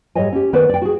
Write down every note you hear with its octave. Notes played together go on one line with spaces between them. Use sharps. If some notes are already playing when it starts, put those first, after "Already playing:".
G#2 G3 A4 C#5 D#5 G#5
C#4 G4
D#3 B3 A4 B4 C5 D5
D5 G5
F#4 G#4